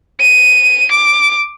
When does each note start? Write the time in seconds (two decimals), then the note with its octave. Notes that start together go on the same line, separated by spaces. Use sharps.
0.20 D#7
0.91 D6